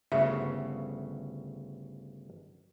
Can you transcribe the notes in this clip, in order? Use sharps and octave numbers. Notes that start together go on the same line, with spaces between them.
G1 D2 C#3 E5